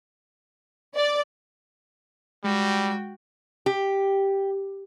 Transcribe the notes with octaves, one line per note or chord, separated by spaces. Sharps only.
D5
G3 G#3 F#4 G5
G4